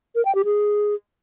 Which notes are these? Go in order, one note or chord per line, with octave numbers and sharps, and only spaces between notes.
A#4
G5
G4
G#4